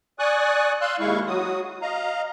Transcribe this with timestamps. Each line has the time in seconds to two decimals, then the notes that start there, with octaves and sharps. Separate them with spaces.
0.19 D5 G#5 C#6 D#6 F#6
0.81 F5 C6 E6 F#6
1.00 D#2 G#3 E4 F5 C#6
1.27 F#3 F#4 D#6
1.82 D#5 F5 A#5